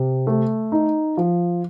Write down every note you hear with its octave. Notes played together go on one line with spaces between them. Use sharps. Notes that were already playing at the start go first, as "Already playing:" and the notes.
Already playing: C3
A3
D#4
F3